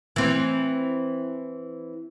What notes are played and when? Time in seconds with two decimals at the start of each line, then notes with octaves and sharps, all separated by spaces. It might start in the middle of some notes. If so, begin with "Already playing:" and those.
0.16 E3 C4